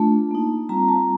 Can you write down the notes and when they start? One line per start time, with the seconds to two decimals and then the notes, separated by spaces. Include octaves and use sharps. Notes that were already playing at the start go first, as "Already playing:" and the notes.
Already playing: A3 D4 F4 A5
0.31 A#3 D#4
0.69 G3 C4 F4 A#5
0.89 A5